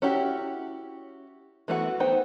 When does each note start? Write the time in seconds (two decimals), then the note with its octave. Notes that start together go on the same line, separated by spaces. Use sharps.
0.02 C#4 E4 F#4 G4
1.68 E3 A3 B3 F#4
2.00 B3 D#4 C5 G5